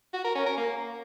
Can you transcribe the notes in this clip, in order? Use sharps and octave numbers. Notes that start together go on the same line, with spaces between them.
F#4
A#4
C#4
A#4
A#3